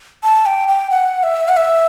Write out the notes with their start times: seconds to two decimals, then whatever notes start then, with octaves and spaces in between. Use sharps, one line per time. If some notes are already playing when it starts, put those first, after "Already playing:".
0.24 A5
0.46 G5
0.68 G5
0.90 F#5
1.23 E5
1.48 F#5
1.57 E5